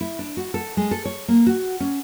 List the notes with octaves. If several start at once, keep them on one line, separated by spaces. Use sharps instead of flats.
E4
D4
F#4
A4
G#3
A4
C#5
A#3
F#4
C#4